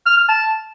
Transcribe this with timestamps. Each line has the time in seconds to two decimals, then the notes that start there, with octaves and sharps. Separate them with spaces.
0.06 F6
0.17 F6
0.29 A5